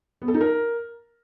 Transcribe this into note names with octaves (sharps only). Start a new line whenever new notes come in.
B3
A4
D#4
A#4